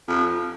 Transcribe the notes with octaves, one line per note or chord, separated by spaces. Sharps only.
F2